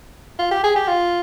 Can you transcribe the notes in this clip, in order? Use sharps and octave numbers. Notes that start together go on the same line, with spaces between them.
F4
G4
G#4
G4
F4